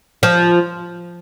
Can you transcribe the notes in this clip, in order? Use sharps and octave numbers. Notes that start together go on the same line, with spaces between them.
F3